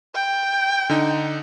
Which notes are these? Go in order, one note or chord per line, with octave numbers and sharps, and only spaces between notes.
G5
D3 D#4